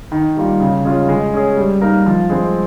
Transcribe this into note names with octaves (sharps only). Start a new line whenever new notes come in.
D#3
G3 A#3 F4
C#3
G#3 C#4 F4
G#3
C#4 G#4
G3
A#3 D#4 A#4
F3
G#3 C4